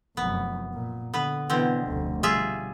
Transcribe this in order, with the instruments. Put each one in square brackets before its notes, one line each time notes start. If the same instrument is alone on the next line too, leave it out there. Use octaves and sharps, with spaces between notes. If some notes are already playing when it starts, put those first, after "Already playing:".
[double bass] F1 F#2 [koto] B3
[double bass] A#2
[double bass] D3 [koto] B3 B4
[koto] B2 D3 C4 [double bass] E3 B3
[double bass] F1 D2
[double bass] G3 [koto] F4 G#4 E5